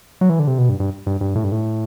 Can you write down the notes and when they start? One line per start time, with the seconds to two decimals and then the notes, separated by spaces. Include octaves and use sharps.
0.21 F#3
0.29 E3
0.39 D3
0.47 C3
0.58 B2
0.69 G2
0.80 G2
1.07 G2
1.21 G2
1.35 A2
1.44 G2
1.52 A2